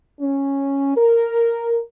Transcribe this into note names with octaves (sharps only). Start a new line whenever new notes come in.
C#4
A#4